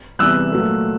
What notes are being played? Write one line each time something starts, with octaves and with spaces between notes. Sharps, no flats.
E2 C3 E3 G3 E6 F#6
A#2 F#3 A3